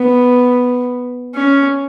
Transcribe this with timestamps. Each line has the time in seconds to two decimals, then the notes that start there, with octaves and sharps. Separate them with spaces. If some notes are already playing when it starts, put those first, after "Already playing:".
Already playing: B3
1.35 C#4